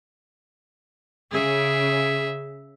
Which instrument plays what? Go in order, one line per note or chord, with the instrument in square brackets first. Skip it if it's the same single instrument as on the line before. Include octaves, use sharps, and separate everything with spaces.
[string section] C#3 [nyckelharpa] G#4 E5